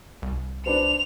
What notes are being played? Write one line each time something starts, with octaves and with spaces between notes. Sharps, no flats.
C2
D4 B4 C5 F7